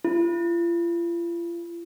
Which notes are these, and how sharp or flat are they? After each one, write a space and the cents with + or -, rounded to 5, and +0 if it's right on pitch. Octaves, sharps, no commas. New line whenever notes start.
F4 -40